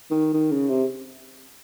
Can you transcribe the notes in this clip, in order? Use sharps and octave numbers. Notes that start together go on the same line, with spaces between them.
D#3
D#3
C#3
C3